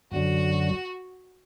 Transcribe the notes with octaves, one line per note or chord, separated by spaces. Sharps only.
F#2 D3 F#3 F#4